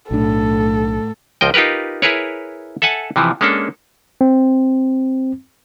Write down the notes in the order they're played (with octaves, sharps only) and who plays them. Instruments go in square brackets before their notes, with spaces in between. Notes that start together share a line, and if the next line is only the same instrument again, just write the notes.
[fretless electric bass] B1 D4 [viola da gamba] A2 [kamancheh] A4
[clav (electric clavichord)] C#2 F3 D#5 G5
D#4 F4 G4 A#4 B4
E4 G#4 A#4 B4 C#5
A4 E5 F#5 G#5 A5
C3 E3 F3
G#3 A#3 C#4 D4 A4
[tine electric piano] C4